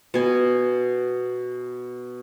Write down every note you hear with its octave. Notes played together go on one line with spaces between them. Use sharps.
B2 G#5